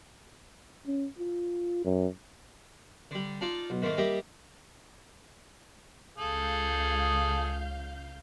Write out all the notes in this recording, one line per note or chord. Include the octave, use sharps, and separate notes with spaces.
C#4
F4
F#2
D3 G3
D#4 F4 D5 A5
B1
G#2 D#3 A3 A#3
G3 A#3 G4 D#5 E5
C#2 G#4 A4 F5 G6